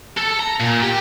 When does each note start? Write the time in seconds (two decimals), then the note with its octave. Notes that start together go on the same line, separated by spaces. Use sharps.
0.17 A4
0.39 A#5
0.60 A#2
0.82 G4